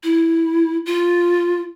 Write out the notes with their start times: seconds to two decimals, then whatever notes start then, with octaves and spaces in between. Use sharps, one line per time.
0.03 E4
0.86 F4